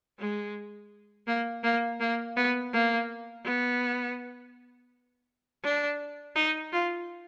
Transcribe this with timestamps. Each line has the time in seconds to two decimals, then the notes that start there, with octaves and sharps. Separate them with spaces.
0.19 G#3
1.27 A#3
1.64 A#3
2.00 A#3
2.36 B3
2.73 A#3
3.45 B3
5.64 D4
6.36 D#4
6.72 F4